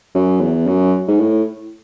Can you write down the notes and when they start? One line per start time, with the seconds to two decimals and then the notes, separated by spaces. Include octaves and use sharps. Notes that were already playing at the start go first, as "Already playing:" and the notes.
0.14 F#2
0.40 E2
0.67 F#2
1.08 G#2
1.20 A2